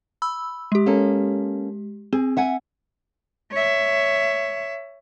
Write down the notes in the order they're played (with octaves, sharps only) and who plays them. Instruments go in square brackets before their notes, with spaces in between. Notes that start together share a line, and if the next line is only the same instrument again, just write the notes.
[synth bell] B5 E6
G#3 G4
[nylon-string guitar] A#3 C#4 A4
[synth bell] C4 [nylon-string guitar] G#4
[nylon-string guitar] E5 F#5 G#5
[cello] C#5 E5